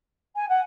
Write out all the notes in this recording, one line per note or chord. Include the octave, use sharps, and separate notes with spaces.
G#5
F#5